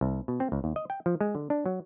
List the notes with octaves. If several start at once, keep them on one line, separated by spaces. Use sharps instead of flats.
C2
B2
C4
C#2
D#2
D#5
G5
F3
G#3
D3
D4
F#3